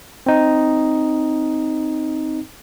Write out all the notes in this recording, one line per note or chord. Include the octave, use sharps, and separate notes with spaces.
C4 D#4